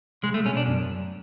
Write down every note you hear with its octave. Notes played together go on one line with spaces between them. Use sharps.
C2 G#3
A3
B2 C#4
D4
F#2